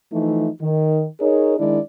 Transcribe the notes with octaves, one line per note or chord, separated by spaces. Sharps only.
E3 F3 A3 D#4
D#3
D#4 G#4 A#4 C#5
D#3 G#3 D4 E4 D5